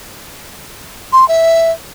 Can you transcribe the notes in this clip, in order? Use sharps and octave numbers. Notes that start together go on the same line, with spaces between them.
C6
E5